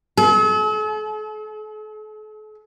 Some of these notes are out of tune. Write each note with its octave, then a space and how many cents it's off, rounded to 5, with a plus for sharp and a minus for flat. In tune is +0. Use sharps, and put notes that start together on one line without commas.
A4 -45